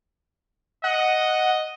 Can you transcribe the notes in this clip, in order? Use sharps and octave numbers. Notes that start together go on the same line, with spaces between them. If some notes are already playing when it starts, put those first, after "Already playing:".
D#5 F#5